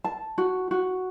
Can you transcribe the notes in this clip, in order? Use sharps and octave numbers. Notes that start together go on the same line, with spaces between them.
A5
F#4
F#4